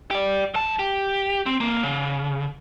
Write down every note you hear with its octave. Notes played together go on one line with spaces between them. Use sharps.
G4 D5
F#2 A5
G4
C4
B1 A#3
C#3